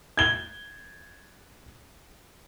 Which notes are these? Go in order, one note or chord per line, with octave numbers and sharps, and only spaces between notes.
G#6 G7